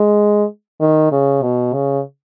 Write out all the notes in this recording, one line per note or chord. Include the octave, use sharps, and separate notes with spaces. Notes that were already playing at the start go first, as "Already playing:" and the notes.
Already playing: G#3
D#3
C#3
B2
C#3